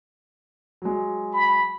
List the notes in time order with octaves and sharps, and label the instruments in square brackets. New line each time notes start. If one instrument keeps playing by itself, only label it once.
[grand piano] F#3 G#3
[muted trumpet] B5